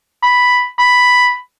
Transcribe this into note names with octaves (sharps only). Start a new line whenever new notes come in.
B5
B5